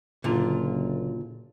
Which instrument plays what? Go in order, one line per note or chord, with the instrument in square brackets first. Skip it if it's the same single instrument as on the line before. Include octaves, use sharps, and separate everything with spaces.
[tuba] F#1 [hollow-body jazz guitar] A#2 D3 F4